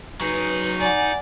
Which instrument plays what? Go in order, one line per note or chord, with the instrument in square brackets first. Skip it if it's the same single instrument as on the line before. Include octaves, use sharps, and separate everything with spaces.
[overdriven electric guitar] F#3 G#4 [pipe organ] D#4 [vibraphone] B4
[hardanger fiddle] D5 [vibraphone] F#5 G#5